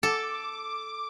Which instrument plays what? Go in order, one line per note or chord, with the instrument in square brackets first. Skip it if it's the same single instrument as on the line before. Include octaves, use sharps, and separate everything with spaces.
[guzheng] A4 [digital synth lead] D6